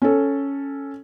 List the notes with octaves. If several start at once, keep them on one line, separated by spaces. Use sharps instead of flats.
C#4 A4